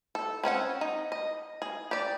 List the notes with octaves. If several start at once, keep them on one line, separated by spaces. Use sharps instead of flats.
A4
C4 C#4 D#4 F#5
D#4
D#5
G#4
G4 D5